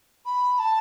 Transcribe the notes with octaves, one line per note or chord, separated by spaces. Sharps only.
B5
A5